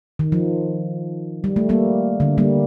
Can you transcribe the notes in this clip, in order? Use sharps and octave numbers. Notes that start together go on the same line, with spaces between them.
D#3
F3
G3
A3
G3 A#3
D3
G3 A#3